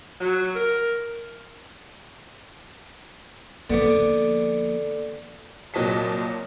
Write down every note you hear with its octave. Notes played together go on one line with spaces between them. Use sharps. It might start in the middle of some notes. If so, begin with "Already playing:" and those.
F#3
A#4
D3 F3 A#3 B3 D6
C2 A#2 F#3 D#5 A5 B6